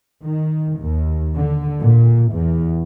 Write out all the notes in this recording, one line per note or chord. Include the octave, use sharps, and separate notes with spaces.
D#3
D#2
D3
A#2
E2